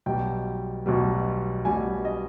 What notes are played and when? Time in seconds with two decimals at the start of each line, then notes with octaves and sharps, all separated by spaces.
0.06 B1 B2 G3 G5
0.86 B1 B2 G3
1.65 B1 B2 G3 G#5
2.05 D#5